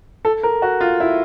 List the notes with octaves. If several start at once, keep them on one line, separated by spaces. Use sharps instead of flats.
A4
A#4
F#4
F4
E4